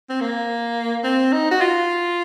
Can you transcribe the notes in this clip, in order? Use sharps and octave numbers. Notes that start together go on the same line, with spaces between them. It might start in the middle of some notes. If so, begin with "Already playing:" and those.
C4
A#3
C4
D#4
F#4
F4